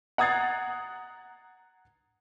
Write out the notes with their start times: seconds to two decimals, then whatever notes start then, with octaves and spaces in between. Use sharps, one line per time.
0.18 F#5 A#5 D#6 G#6 A6 C7